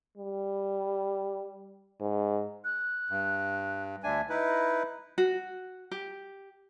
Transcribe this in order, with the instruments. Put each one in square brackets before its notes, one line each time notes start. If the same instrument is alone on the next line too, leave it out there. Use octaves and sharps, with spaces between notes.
[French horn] G3
G#2
[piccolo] F#6
[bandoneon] G2
[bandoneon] D2 D4 G#5 [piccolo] E5
[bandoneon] D#4 E4 B4 [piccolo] D#5
[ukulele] F#4
G4